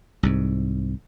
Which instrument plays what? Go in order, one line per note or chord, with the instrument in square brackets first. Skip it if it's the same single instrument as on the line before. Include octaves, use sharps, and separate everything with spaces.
[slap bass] C2 G#2